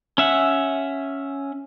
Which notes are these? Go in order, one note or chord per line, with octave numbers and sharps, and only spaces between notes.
C#4 E5 F#5